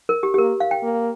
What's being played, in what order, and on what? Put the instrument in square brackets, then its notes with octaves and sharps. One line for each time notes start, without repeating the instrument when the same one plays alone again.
[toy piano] A#4
G4
G4
[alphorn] A#3 [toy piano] A#4
[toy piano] F5
G5
[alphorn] A#3